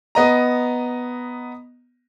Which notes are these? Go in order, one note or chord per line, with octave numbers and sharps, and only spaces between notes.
B3 D#5 A#5